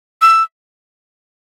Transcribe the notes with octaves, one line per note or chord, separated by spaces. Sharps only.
E6